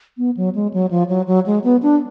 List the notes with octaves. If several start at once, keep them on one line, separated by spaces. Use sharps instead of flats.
B3
F#3
G#3
F#3
F3
F#3
F#3
G#3
B3
D4